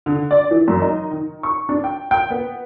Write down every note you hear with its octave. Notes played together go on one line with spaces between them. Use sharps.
D3
D5
E3
F#2
D#4
D#3
C#6
D4
G5
G5
B3